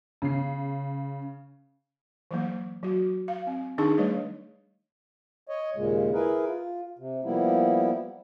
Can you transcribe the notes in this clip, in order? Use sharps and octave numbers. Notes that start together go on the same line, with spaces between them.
C#3 C7
E3 F#3 A#3
F#3 F#4
F5
C4
D#3 D4 D#4 G#4 C#6
G3 A3 B4 C#5 D5
C#5 D#5
D#2 A#2 C#3 G#3
E4 G#4 A#4 B4
F4
C3
F3 G3 A#3 B3 E4